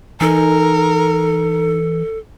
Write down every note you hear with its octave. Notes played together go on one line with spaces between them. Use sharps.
E3 D#4 A4 A#4 G#5